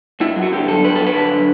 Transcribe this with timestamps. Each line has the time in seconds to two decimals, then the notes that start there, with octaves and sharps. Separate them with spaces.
0.20 G2 E4
0.36 F#3
0.43 F#4
0.52 D3 G4
0.68 G2 A4
0.84 G2 B4
0.95 A4
1.00 F#3
1.06 B4
1.16 D3